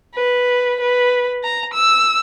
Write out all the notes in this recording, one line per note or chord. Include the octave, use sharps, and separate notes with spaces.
B4
B4
A#5
E6